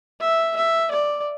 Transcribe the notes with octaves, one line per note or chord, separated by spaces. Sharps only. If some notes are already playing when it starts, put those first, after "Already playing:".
E5
E5
D5